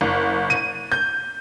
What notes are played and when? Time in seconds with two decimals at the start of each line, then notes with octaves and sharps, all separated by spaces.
0.01 F#1
0.50 D#7
0.92 G6